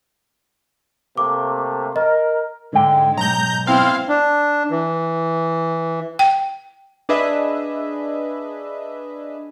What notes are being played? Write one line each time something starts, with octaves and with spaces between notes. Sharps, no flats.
C3 A3 A#3 D6
A#4 D#5
G#2 D3 G#3 G5
B1 A#5 G6
B3 C4 E4 F5
D4
E3
G5
D4 G#4 B4 D#5 E5